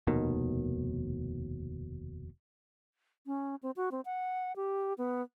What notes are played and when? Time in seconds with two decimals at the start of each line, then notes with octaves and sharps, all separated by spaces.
0.07 F1 D#2 B2 D#3
3.26 C#4
3.63 C4
3.76 F#4
3.92 C4
4.05 F#5
4.56 G4
4.98 B3